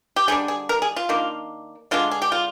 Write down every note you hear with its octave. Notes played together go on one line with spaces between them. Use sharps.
G4
D3 G3 D4 G#4
G#4
A#4
G#4
F4
D#3 A#3 D4
D3 G#3 D4 F4
G#4
G4
F4